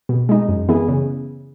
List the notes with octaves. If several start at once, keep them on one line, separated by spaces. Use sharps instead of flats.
B2
G#3 D#4
F#2
E3 B3 E4 G#4
C#3